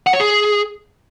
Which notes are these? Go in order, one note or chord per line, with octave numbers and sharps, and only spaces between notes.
F#5
C#5
G#4